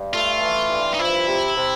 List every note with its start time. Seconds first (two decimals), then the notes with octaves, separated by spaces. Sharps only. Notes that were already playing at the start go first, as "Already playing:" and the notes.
Already playing: G2
0.14 A3 F4
0.42 E3
0.71 G2
0.94 D#4
0.99 F3 E4
1.28 C3
1.57 C3